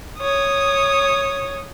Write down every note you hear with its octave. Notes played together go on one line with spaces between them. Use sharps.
C#5 D#6